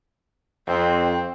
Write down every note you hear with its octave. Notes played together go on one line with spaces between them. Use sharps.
F2 C4